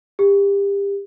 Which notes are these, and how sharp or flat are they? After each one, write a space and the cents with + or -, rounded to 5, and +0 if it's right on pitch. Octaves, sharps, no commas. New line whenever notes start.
G4 +30